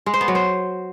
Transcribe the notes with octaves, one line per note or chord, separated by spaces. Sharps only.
G#3
C5
B3
F#3
C5